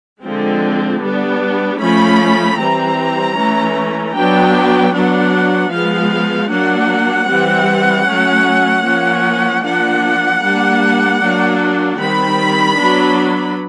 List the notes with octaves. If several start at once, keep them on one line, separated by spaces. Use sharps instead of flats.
D3 F3 G#3 C4
G3 B3 D4
F3 A3 C#4 B5
E3 G3 C4 A#5
E3 A3 C#4
F#3 B3 D4 G5
F#3 B3 D4 F#5
F3 G#3 B3 F5
F#3 A#3 D4 F#5
E3 G3 C4
F#3 A3 C#4
F3 A#3 C#4
F3 A#3 D4 F#5
G3 A#3 D4
F#3 A#3 D4
D#3 G3 C4 B5
F#3 B3 D4